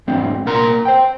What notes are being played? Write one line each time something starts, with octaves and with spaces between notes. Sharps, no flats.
E2 G#2 G#3 C4 D4
C2 A#2 A#4 A#5 C6
C5 G5